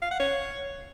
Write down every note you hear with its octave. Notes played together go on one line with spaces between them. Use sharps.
F5
F#5
C#5